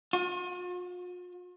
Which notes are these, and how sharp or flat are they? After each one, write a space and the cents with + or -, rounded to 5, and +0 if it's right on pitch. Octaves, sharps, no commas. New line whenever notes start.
F4 +45